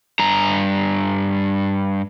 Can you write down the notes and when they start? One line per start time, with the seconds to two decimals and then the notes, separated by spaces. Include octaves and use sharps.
0.19 G2 A#5